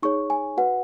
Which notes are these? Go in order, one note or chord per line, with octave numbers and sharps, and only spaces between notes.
D#4 G#4 C#5 C#6
G#5
F#4 B4 F#5